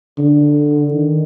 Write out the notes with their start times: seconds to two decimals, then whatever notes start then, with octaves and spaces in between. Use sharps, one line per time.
0.18 D3
0.93 D#3